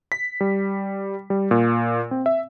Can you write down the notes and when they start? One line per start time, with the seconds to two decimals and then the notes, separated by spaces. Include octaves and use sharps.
0.12 B6
0.41 G3
1.30 G3
1.51 A#2
2.11 C4
2.26 E5